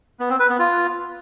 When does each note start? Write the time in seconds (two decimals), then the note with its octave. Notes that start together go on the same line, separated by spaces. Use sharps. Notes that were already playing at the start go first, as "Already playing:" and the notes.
0.20 B3
0.30 C4
0.40 B4
0.49 B3
0.59 F4